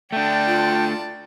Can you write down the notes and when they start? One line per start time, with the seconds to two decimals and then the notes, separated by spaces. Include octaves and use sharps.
0.12 A3 D4 D5 G5 A5
0.46 F4